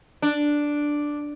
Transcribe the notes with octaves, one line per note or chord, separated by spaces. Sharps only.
D4